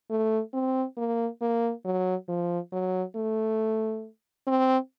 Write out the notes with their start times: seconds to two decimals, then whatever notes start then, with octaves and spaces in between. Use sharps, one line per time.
0.10 A3
0.54 C4
0.97 A#3
1.41 A#3
1.85 F#3
2.29 F3
2.72 F#3
3.16 A3
4.47 C4